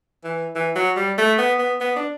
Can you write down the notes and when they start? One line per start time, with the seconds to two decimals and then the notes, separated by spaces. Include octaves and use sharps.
0.24 E3
0.56 E3
0.76 F#3
0.96 G3
1.18 A3
1.38 B3
1.59 B3
1.80 B3
1.96 D4